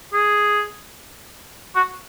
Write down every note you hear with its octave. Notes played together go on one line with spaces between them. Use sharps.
G#4
F#4